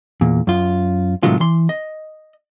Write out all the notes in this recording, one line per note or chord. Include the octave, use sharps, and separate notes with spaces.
E2 A#2
F#2 F4
A2 C3 D#3 F#3 G#3 F4
E3 C6
D#5